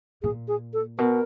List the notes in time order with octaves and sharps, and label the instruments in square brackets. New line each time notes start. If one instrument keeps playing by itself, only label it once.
[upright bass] A#2 [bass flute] G#4
[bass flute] G#4
A4
[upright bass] B2 [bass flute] A#4